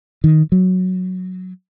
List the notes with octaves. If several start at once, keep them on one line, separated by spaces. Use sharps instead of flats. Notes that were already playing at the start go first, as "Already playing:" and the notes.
D#3
F#3